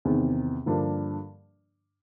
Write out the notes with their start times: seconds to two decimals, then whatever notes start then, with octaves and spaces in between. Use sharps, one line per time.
0.05 E2 C3 D#3
0.66 G2 D3 F3 A#3 D4